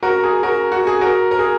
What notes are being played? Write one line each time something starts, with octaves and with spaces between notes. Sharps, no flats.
F#4 A#4
G#4
F#4 A#4
F#4
G#4
F#4 A#4
A#4
G#4